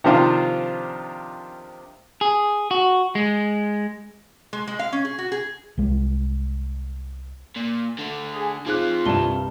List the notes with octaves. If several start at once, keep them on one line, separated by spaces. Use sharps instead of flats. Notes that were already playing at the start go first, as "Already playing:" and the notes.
C3 D#3 F3 D4 F4
G#4
F#4
G#3
G#3
G#3
F5
C#4
G#4
F#4
G#4
C2 G#3
A#2
D3 A3
G#4
F3 C4 D#4 F4 G#4 F#6
C2 G2 D5 A5 E7 G7